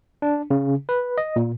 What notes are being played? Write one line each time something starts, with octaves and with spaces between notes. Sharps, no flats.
D4
C#3
B4
D#5
A#2